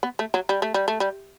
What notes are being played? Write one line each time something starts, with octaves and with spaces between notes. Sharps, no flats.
B3
A3
F#3
G3
A3
G3
A3
G3